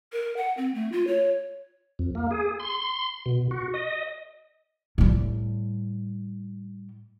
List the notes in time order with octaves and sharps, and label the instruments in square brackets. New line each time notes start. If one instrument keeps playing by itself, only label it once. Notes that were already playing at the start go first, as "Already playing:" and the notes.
[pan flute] A#4
F#5
C4
A3
F4
C#5
[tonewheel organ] F2
A#3
G#4
C6
B2
F#4
D#5
[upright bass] A2 G3